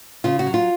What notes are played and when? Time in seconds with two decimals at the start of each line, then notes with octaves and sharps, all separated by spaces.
0.24 C#3 F4
0.39 F#4
0.47 F#3
0.54 F4